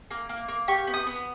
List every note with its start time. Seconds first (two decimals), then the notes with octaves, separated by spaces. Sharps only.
0.11 A#3
0.29 A#3
0.48 A#3
0.68 G4 C#6
0.87 B3
0.94 D#6
1.06 B3